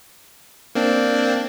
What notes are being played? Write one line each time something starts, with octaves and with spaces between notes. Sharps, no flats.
A#3 C4 D4